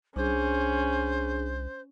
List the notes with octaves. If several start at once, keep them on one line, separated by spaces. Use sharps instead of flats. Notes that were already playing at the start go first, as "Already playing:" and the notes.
C2 C#4 D4 G#4 C5